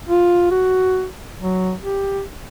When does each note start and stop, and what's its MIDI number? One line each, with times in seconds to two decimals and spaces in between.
0.09 0.49 65
0.51 1.06 66
1.40 1.73 54
1.82 2.22 67